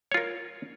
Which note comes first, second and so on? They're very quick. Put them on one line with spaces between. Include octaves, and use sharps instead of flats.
C#5 F4 A#4